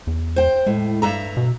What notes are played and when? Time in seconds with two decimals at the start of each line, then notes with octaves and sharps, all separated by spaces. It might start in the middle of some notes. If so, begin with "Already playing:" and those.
0.07 E2
0.36 C5 G5
0.66 A2 G#3
1.02 G2 E5 A#5
1.37 B2